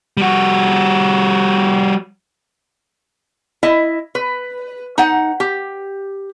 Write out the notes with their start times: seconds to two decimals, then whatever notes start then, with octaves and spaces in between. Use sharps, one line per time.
0.17 G3 F#4
3.63 E4 D#5
4.15 B4
4.98 D#4 F#5
5.40 G4